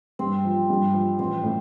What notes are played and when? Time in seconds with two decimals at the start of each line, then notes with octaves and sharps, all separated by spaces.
0.19 G2 C4
0.45 F3
0.70 G2
0.94 F3
1.19 A1 C4
1.43 A2